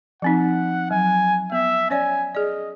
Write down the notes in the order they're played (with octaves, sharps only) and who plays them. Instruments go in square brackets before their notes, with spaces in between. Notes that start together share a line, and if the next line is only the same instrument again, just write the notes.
[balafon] F3 C4 D#4 [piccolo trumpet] F#5
[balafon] F#3 [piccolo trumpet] G#5
[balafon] B3 [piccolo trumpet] E5
[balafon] C#4 C#5 D5 [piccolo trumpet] G#5
[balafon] G#4 D5 [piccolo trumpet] D#5